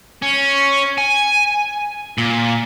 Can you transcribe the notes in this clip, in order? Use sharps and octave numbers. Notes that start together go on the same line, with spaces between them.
C#4
G#5
A#2